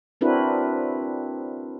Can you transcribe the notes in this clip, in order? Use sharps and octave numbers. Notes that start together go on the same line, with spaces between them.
C4 D4 E4 F#4 A#4 B4